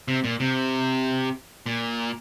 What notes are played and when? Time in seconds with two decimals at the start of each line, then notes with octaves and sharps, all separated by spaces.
0.08 C3
0.24 A#2
0.40 C3
1.66 A#2